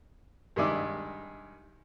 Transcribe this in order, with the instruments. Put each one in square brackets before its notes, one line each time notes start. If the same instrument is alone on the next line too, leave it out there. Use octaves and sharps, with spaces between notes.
[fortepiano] G2 D#3 G#3 D5 E5